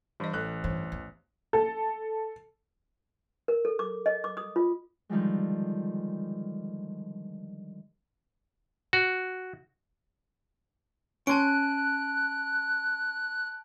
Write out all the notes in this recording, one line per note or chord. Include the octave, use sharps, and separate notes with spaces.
G2 E3 D#5
A1 A4 F#6
G2 E3
E2
A4
A#4
A4
D6
D#5
D6
D#6
F4
D3 D#3 F3 G3 G#3
F#4
C#4 A5 C6 F#6 D7